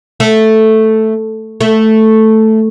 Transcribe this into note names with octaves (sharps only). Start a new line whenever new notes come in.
A3
A3